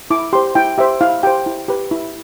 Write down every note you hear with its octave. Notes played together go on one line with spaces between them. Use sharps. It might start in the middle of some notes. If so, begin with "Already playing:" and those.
E4 D6
G4 C5 C6
E4 G5
G4 C5 E5
E4 F5
G4 C5 G5
E4
G4 B4
E4